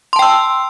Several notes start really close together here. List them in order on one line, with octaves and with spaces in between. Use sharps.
C6 A5 G5 E6